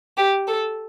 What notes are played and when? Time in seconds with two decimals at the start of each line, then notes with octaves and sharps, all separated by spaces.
0.18 G4
0.48 A4